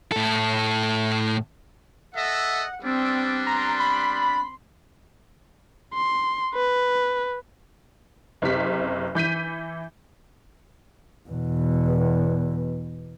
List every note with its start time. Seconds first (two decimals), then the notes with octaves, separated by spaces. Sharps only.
0.12 A2 A4
2.15 A4 D#5 E5 F#5
2.83 G3 B3 C4 D4
3.47 A#5 C6
3.80 B5
5.94 C6
6.55 B4
8.42 F#1 C3 B6
9.15 E3 G6 B6 D#7
11.30 E2 B2